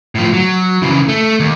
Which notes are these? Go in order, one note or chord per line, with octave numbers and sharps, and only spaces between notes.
A2 F3
F#3
C#3 E3
A3
D#2